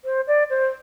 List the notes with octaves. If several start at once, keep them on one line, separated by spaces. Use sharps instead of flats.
C5
D5
C5